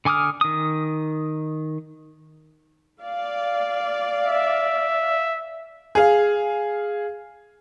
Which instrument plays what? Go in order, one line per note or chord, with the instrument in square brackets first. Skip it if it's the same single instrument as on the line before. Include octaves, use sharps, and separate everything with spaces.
[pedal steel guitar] D3 G#5 D6 D#6 F6
D#3 D#6
[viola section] D5 F5
[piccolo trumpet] E5
[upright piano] G#4 F5